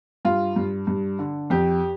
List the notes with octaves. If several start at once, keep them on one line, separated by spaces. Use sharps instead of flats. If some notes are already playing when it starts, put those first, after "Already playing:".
G2 F4
G2
G2
D3
F2 G4